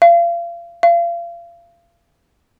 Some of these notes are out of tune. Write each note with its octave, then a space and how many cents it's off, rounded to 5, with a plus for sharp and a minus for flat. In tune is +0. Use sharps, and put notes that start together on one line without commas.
F5 -35
F5 -35